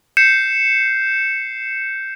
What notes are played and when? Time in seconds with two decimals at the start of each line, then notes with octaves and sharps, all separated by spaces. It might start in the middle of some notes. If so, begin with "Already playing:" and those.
0.17 G6 C7 C#7 E7